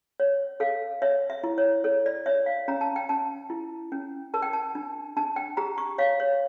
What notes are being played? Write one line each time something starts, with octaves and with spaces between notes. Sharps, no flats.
C#5
A4 F5
C#5 E5
E5
E4
C#5
A4 C#5
D5
C#5 E5
F5
C#4 A#5
A5
G5
C#4 A5
E4
C#4
A#4 A5
G5
A5
D4
D4 A5
G5
G4 A#5
C#6
C#5 F5
C#5